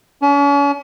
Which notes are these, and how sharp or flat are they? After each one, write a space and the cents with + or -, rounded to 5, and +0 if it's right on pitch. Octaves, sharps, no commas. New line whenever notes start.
C#4 +40